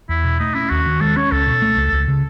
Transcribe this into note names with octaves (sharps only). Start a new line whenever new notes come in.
E2 E4
B2
A3 D#4
C#4 E4
D#2 F#4
D#3
G#3 A4
C#4 C#5
C#2 A4
B2
A3
C#2
C#2
C#3